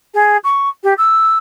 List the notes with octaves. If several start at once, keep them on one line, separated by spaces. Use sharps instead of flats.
G#4
C#6
G4
E6